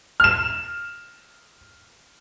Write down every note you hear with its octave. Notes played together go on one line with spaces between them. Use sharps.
F6 E7